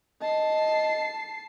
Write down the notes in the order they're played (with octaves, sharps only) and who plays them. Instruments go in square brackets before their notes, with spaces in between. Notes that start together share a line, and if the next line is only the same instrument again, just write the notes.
[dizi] D#5 [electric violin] A5 C7